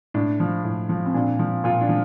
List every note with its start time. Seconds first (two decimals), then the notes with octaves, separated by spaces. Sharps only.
0.14 A2 D4
0.40 F3
0.64 A2
0.89 F3
1.06 C4
1.14 A#2 D4
1.39 F3
1.64 A#2 F4
1.81 D4
1.89 F3